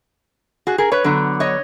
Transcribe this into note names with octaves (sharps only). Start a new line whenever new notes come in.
F#4 G#4
G#4 A#4
B4 C#5
D3 F#3 B3
C#5 D#5